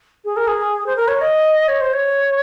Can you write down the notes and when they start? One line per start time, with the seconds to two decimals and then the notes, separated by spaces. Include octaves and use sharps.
0.25 G#4
0.36 A#4
0.48 G#4
0.86 C5
0.96 A#4
1.08 C#5
1.21 D#5
1.68 C#5
1.81 C5
1.93 C#5